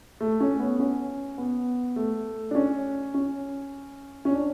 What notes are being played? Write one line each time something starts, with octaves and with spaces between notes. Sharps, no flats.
A3
C#4
B3
C#4
B3
A3
D4
C#4
C#4
C#4
D4